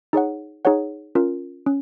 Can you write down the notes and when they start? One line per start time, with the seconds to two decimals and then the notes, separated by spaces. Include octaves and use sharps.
0.13 D#4 G#4 C#5 F#5
0.65 D#4 G#4 C#5 F#5
1.15 C#4 F4 A#4
1.66 C#4